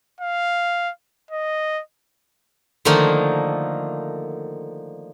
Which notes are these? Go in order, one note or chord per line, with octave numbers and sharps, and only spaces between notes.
F5
D#5
D3 D#3 F3 A3 A#3 D#4